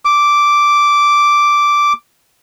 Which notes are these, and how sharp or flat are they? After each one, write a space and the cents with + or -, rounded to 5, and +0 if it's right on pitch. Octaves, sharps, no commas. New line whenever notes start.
D6 -5